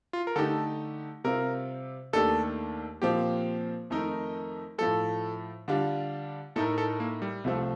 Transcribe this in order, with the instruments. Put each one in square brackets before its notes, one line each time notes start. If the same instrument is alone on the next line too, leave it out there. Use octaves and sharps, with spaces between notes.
[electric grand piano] F4
A#4
[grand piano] D3 A3 D#4 G4 [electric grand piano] A4
[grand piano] C3 G3 C4 F4 [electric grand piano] A#4
[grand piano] D#2 D#3 A3 D4 G4 [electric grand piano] A4
[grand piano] A#2 F3 C4 [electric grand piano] G4
[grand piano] F2 D#3 A3 D#4 A#4
[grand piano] A2 F3 A3 [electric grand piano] A4
[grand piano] D3 G3 D4 F4
[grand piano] A2 A3 D#4 A#4 [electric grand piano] A4
[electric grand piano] A4
A#3
G3
[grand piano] C2 C3 F3 A3 C4